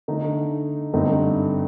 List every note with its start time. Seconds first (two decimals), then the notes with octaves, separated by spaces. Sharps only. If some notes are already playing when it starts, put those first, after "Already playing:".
0.08 D3 A3 D#4
0.94 G2 D3 A3 C4 D#4